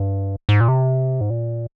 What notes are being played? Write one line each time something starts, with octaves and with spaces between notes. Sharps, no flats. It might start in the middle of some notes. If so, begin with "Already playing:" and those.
Already playing: G2
G#2
A#2
C3
G#2
A#2